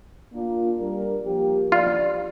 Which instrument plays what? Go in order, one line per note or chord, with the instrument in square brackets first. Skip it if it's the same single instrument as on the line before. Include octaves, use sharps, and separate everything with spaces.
[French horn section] A#3 D4 F4
G3 D4 A#4
F3 A#3 G4
[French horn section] F3 D4 G4 D5 [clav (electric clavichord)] F4